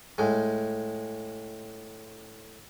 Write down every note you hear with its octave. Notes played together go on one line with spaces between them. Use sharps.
A2 G#3